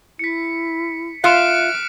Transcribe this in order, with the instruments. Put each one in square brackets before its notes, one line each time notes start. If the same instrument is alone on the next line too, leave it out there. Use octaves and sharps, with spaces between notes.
[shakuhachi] E4 [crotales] B6 C#7
[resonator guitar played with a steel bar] F4 F5 [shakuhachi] E5 [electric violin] F6 D7 [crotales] F#6 C#7 E7